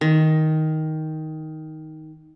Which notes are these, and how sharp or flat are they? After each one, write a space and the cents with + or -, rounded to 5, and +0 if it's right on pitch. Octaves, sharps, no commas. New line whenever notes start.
D#3 +10